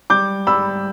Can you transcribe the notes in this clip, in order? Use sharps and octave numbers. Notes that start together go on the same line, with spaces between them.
G3 D6 G6
G3 B5 E6